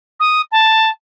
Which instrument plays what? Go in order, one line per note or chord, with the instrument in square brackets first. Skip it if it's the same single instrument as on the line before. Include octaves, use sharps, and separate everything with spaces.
[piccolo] D#6
A5